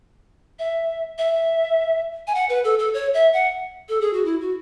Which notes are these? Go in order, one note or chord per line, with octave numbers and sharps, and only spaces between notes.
E5
E5
G#5
F#5
B4
A4
A4
C#5
E5
F#5
A4
G#4
F#4
E4
F#4